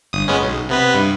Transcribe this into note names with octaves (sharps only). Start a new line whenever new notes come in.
G1 D#6
G#3 B3 C#4
B1
C3 B3 B4
G2